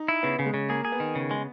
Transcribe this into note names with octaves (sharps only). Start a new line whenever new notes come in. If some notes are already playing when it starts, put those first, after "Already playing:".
Already playing: D#4
E4
C#3 B3
C#3
G#3
C#3
A#3 G#4
G#4
B3
D#3
C#3
G#3